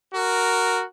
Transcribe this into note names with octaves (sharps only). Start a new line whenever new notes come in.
F#4 A#4